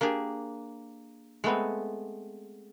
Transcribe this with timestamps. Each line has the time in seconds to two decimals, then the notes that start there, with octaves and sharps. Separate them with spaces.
0.01 A#3 D4 G4 G#4
1.44 G#3 A3 B3 C4